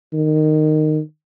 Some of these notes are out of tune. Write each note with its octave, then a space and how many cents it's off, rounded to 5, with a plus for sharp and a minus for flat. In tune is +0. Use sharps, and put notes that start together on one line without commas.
D#3 -15